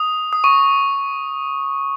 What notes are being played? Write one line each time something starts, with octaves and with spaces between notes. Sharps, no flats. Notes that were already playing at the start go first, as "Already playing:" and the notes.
Already playing: D#6
D#6
C#6